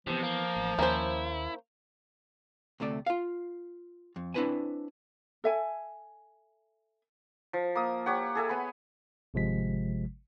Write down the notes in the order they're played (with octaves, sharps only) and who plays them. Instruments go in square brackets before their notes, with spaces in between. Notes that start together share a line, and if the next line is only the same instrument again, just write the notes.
[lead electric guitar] C3 [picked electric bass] E3 B3 [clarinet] F3
[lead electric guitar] A#3
[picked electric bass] A1
[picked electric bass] D#2 [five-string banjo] A#3 C#4 C5 [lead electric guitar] E4
[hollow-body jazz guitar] D2 C3 A3 D5
F4 F5
F2
C4 D4 E4 B4 C5 G#5
[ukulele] A4 E5 G#5
[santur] F3
A#3 D#6
G4 C#5 F#5
G#4 A4 E5 G#5
B3 B5
[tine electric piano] G#1 C3 F3 G#3 B6